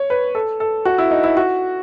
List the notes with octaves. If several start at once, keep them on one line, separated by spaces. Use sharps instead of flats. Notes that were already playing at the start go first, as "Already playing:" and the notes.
Already playing: C#5
B4
A4
A4
F#4
E4
D#4
E4
F#4